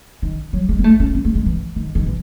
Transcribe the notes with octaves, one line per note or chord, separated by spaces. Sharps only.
D#3
F#3
G#3
B3
A3
C#4
B3
A3
G#3
E3
D#3
D#3
E3